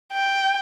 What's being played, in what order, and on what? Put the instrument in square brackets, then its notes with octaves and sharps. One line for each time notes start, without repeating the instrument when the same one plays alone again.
[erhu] G5